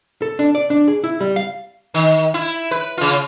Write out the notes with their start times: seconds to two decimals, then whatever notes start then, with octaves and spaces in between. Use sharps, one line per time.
0.22 A4
0.39 D4
0.55 D5
0.70 D4
0.88 G#4
1.04 E4
1.21 G3
1.36 F5
1.94 D#3
2.34 E4
2.71 B4
2.98 C#3 F4